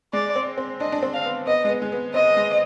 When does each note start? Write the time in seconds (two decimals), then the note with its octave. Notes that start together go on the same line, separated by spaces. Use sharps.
0.13 G#3 D5
0.35 C4
0.57 C4
0.80 D4 D#5
0.92 D4
1.03 C4
1.14 F5
1.25 B3
1.47 B3 D#5
1.65 G#3
1.69 B3
1.82 G#3
1.92 B3
2.14 C4 D#5
2.37 G#3